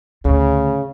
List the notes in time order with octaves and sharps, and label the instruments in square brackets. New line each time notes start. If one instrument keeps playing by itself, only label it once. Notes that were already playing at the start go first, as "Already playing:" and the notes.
[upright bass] D2 A2 [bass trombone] C#3